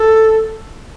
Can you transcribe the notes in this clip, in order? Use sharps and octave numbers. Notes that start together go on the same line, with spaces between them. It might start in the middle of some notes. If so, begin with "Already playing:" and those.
Already playing: A4